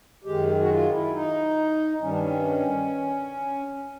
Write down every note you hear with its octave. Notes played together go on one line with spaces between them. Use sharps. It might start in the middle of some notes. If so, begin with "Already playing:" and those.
F#2 D#3 G#3 G4
F#4
F4
E4
D#4
G2 D#3 G3 C#4
D4
C#4